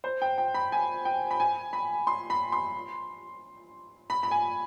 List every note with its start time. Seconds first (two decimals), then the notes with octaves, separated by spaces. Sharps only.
0.04 C5
0.22 G5
0.38 G5
0.54 B5
0.72 G#5
1.05 G5
1.31 B5
1.40 G#5
1.73 B5
2.07 C6
2.30 B5
2.52 C6
4.10 B5
4.23 B5
4.31 G#5